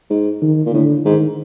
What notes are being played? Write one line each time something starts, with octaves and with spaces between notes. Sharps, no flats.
G#2
D#3
A#2
A2 D3
G#2 D#3